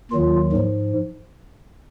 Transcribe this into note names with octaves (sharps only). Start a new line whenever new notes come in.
D#2 D#3 F#3 F4
G#2 F3